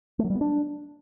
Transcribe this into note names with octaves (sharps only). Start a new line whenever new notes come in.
A3
F#3
G3
B3
D4